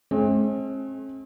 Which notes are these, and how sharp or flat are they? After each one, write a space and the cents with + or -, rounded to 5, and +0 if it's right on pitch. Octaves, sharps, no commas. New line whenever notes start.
G#3 +45 C4 +45